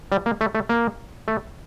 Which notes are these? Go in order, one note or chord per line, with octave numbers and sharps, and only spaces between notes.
G3
A#3
A3
A3
A#3
A3